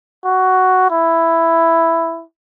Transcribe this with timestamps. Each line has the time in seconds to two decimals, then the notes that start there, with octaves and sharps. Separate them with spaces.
0.25 F#4
0.90 E4